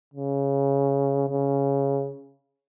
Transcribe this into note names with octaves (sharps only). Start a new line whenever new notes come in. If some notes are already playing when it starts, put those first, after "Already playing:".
C#3
C#3